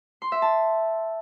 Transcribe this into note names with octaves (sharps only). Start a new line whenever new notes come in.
C6
E5
A5